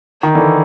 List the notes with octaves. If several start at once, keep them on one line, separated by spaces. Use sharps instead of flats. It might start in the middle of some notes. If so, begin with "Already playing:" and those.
D#3
D3 E3